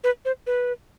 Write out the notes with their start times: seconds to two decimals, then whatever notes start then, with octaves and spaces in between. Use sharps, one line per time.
0.04 B4
0.25 C5
0.47 B4